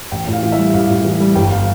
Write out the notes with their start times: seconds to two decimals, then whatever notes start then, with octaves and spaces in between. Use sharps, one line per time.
0.11 A1 G5
0.27 A2
0.33 F5
0.43 E3
0.52 E5
0.57 G3
0.73 A1 F5
0.90 A2
1.05 E3
1.20 G3
1.35 G1 G5
1.51 F5